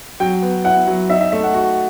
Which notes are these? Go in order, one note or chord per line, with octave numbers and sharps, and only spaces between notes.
F#3 G5
B3
E4 F#5
F#3
D#4 E5
E5
A3 E5
F#5
F#4